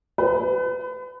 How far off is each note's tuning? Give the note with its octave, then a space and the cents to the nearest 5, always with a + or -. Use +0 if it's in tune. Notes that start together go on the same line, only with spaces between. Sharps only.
B4 +35